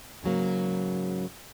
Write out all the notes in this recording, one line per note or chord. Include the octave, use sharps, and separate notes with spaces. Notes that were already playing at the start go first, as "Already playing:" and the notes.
G#2 C#3 F#3 A#3